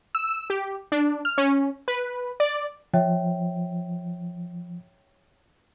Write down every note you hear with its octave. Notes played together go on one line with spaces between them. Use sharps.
E6
G4
D4
F6
C#4
B4
D5
F3 C#5 E5 G5